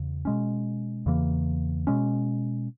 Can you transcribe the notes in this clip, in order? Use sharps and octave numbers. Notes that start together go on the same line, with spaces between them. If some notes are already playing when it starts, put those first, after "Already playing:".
Already playing: E2 C#3
B2 G#3 C#4
E2 C#3 E3 A#3
B2 G#3 C#4